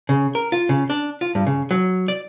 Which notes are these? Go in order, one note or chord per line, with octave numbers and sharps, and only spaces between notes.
C#3
A#4
F4
C#3
D4
F4
G2
C#3
F#3
D5